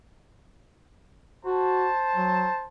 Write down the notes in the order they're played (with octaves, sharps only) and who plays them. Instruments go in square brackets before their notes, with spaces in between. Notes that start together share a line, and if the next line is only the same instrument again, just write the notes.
[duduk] F#4 [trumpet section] C5 A5
[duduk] F#3